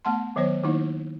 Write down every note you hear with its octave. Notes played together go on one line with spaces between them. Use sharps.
A3 B3 F#5 A5 C6
D#3 F#3 B3 C5 C#5
D#3 A#3 D#4 E4